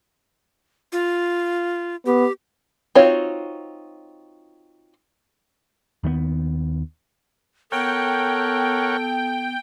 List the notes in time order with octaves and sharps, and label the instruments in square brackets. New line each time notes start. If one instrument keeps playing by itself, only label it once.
[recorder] F4
[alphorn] B3 [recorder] G4
[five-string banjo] C4 D#4 F4 F#4 C#5
[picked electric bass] D#2 D#3 G#3 B3
[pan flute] B3 [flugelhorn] A4 [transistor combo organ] A#4 C#5 F#5 [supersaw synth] G5